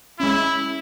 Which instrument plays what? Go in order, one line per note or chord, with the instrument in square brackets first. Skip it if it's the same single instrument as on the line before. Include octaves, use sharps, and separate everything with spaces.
[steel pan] G#3 C#4 [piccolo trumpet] E4